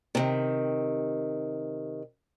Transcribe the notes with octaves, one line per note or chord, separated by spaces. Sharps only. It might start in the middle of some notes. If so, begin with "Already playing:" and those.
C3 D#3